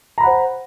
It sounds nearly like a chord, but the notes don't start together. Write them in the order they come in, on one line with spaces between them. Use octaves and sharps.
A#5 B5 F#5 C5